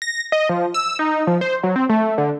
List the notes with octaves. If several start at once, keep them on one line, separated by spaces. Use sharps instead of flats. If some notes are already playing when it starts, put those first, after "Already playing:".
A#6
D#5
F3
E6
D#4
F3
C5
F#3
C4
A3
D3